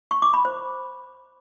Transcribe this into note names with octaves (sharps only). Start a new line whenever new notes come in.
C#6
D6
B5
C5